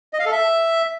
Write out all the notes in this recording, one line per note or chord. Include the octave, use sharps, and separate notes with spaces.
D#5
F5
A4
E5